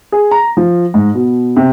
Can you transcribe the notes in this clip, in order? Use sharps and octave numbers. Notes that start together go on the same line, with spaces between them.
G#4
A#5
F3
G#2
B2
C3